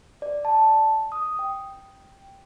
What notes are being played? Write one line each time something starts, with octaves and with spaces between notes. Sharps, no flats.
D5
A5
D#6
G5